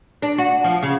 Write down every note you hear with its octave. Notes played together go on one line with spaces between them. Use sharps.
D4
F#4
F3
C#3